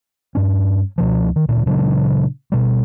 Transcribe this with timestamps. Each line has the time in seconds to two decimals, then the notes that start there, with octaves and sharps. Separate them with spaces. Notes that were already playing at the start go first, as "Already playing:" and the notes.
0.35 G2 C#4
0.98 C#2 B2 F3
1.36 D#3
1.49 D2 A#2
1.66 A#2 C#3 F#3 D4
2.52 B2 G3